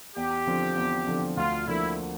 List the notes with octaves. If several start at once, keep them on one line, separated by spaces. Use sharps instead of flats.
E2 G4
D3 F3 C4
E2
D3 F3 C4
D2 F4
D3 F3 A#3 E4